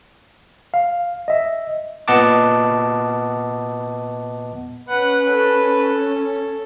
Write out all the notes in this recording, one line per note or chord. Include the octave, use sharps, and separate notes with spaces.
F5
D#5 E5
A#2 B3 D#5 F#5 A5 D6
C#4 B4 F#5
A4